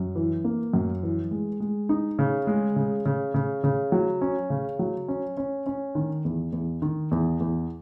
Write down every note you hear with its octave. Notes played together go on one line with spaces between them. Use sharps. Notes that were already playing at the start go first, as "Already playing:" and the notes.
Already playing: F#2
E3
A#3
F#2
E3
G#3
G#3
D#4
C#3
G#3
C#3
C#3
C#3
C#3
F#3
C#4
C#3
F#3
C#4
C#4
C#4
D#3
E2
E2
D#3
E2
E2